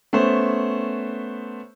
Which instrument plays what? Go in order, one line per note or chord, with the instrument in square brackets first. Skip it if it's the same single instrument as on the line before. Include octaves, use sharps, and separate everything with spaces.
[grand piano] A3 B3 C#4 C5